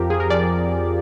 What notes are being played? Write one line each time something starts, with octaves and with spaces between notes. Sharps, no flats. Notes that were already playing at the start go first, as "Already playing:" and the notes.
Already playing: F2 F3 F4 G4 A#4
F3 G#4
A#4
F3 D5